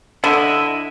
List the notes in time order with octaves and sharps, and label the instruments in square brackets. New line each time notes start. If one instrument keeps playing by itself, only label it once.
[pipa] D3 [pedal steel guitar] E4 D#5 E5